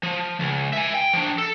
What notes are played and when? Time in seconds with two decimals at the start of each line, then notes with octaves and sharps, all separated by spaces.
0.03 F3
0.40 C#2
0.73 E5 G#5
0.95 G5
1.13 F3 D4
1.38 A4